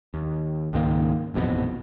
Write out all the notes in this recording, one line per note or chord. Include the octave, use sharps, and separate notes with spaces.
D#2
C#2 G#2 D#3 A#3
D#1 A1 F2 B2